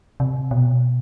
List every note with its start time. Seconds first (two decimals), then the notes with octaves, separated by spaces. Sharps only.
0.20 C3
0.51 B2